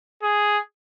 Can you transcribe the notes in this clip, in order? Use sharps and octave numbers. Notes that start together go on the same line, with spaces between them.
G#4